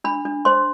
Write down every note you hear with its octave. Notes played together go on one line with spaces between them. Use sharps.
D4 B5
D4
C5 C6